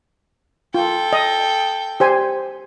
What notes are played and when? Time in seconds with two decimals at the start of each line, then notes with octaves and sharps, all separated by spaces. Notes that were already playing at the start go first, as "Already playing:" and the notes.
0.74 F4 A4 G5
1.13 D#5
2.00 G4 C5 G#5